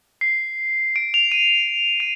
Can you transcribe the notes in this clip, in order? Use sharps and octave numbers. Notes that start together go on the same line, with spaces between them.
C7
D7
F7
D#7
D#7